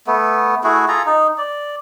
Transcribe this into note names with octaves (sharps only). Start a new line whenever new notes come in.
A3 B3
A3 E4 F#4 G#4
F4 G#4 A4 A#5
D#4
D5